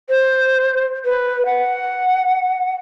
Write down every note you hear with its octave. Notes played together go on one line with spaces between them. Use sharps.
C5
B4
F#5